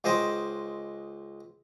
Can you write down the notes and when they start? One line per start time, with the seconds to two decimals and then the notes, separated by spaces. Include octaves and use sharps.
0.04 C#2 G#3 C5 D#5 G5